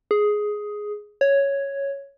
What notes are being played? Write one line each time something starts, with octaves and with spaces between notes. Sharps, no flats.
G#4
C#5